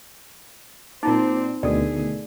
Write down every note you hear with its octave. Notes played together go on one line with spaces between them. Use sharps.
A#2 C4 D#4 F4 C5 D5
D2 B2 D#3 A3 G#4 A4 D5